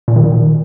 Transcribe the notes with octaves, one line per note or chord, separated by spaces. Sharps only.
A#2
D#3
A#2